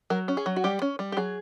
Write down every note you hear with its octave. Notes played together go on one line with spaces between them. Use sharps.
F#3 A#4
C#4
G#4
F#3
F#4
G3 G4
C#4
G3
G4
F#3 G#4